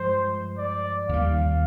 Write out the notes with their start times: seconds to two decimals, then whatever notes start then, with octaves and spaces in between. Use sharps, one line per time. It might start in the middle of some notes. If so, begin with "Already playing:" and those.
Already playing: G2 F3 G#3 C5
0.58 D5
1.09 D#2 D#3 G3 F5